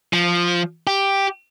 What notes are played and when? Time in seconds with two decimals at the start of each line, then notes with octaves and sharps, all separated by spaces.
0.13 F3
0.87 G4